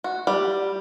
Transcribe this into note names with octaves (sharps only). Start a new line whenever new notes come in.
F#4
G3